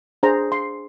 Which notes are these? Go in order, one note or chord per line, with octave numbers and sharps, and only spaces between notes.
D4 G#4 C5 A#5
C6